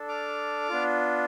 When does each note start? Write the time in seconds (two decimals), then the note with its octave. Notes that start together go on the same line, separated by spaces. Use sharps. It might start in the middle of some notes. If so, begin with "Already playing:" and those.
Already playing: D4 A4
0.09 D6 F6
0.69 B3 D4 F4